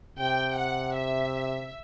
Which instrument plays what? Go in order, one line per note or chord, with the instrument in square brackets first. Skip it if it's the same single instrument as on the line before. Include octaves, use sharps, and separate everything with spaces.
[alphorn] C3 [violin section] G5
[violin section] F#5
E5